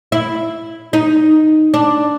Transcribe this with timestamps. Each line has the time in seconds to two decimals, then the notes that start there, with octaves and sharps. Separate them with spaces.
0.12 E4
0.93 D#4
1.74 D4